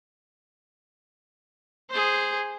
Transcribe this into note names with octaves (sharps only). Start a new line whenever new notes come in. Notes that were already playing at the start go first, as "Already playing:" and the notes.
G#4 C5